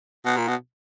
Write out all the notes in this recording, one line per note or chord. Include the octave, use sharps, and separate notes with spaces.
B2
A#2
B2